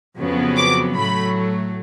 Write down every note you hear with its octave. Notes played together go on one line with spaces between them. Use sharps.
F2 C#3 F#3 B3
D6
A2 F#3 A3 B5